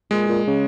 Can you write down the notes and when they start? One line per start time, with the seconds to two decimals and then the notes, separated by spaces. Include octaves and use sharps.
0.11 A#2 G#3
0.28 A#2
0.47 C#3